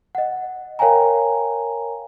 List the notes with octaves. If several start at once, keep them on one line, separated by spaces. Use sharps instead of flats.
D#5 F#5
A#4 C#5 F5 G5 G#5 A#5